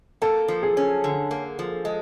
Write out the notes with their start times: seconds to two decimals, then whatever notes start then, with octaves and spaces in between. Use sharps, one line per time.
0.22 A#3 A4
0.48 F3
0.63 G#4
0.77 C#4
1.04 D3
1.31 A#3
1.59 F3
1.85 G#3